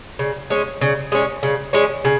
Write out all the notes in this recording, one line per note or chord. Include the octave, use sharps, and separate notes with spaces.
C#3
G#3 C#4
C#3
G#3 C#4
C#3
G#3 C#4
C#3